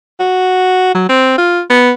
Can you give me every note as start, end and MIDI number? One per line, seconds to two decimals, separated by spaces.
0.19 0.90 66
0.94 1.07 54
1.09 1.37 60
1.37 1.61 65
1.70 1.91 59